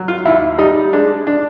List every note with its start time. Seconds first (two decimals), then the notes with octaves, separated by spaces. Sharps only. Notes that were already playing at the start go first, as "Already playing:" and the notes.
Already playing: F#3
0.08 F4
0.25 D#2 E4
0.58 G3 D#4
0.93 G#3 D4
1.27 D4